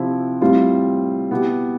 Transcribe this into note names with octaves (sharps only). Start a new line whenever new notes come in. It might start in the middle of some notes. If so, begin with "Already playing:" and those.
Already playing: C3 F3 C4 E4
A2 G3 C4 F4
B2 B3 E4 G4